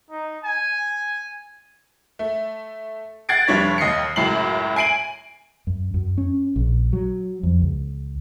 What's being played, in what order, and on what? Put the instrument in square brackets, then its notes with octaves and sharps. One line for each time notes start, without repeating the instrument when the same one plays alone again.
[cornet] D#4
G#5
[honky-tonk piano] A3
F#5 F#6 G#6 A6 C7 D7
F1 G3 D4 C#5 B6
D#2 D#5 C7 C#7
C#2 F#2 A2 C7 F#7
G#5 C7 D7 D#7 F#7
[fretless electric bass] F#2
F#2
C#4
A#1
F#3
F2
C#2